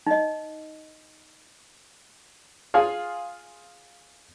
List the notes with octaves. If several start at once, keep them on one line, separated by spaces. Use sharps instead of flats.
D#4 D#5
F4 G#4 F5 G#5